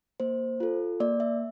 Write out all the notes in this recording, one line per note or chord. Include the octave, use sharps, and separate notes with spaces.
A#3 C5
F4 A4
A#3 D5
E5